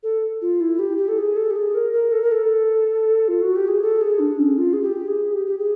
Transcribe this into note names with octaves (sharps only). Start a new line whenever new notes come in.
A4
F4
E4
G4
G4
A4
G#4
A4
G4
G#4
A#4
A#4
A4
A#4
A4
F4
F#4
G4
G#4
A4
G#4
D4
C#4
F4
G#4
G4
G#4
G4
G4
G#4